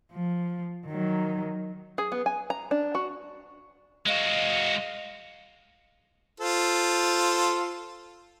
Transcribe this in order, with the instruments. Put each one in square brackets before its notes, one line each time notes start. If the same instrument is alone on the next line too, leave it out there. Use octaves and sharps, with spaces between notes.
[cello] F3
D#3 F#3
[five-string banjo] G#4
B3
G#5
A#5
D4
F#4
[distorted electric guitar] G#3 F#4 [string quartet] D#5 F5
[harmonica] F4 A4 C5